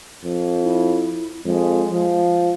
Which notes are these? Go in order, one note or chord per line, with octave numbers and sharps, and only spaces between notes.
F2
E4
F2 G#3
F3